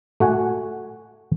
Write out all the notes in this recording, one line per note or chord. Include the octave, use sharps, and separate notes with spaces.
A3 F#4 F#5 G#5